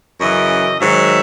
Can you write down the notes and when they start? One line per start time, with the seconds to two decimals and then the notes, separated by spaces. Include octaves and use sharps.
0.20 F#2 C#3 E3 D#5
0.80 G#2 D#3 F#3 E5